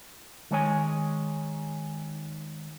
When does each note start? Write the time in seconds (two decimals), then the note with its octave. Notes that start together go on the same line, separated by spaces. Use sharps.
0.51 D#3 G#3 C#5 G#5